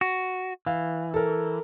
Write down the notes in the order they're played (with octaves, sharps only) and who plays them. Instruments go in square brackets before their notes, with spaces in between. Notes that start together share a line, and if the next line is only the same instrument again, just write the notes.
[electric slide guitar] F#4
[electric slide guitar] E3 [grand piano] F5
[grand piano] A4 A#4